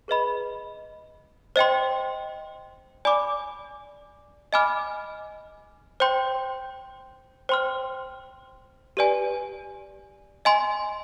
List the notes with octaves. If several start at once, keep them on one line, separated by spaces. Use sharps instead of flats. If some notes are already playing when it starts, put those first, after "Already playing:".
G#4 B4 D#5 B5
C5 D#5 G5 C6
D5 G#5 B5 D6
D#5 G#5 B5 D6 F6
C5 G5 C6 G6
C5 G5 C6 F6
G4 B4 D5 G#5
D#5 G#5 C6